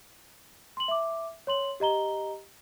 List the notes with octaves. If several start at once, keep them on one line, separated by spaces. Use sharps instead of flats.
C6 F#7
E5 D6
C#5 C6 F#7
G4 D#5 A#5 G7